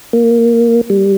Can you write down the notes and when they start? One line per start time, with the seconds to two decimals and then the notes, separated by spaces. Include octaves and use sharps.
0.13 A#3
0.90 G3